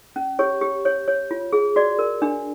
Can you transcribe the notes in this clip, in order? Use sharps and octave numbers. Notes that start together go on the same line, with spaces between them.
C#4
G4 C#5
G4
C#5
C#5
F4
G#4
F#4 D5
A#4
D4